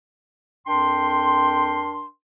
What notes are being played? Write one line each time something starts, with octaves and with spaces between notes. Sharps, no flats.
F2 D4 A#4 G5 C6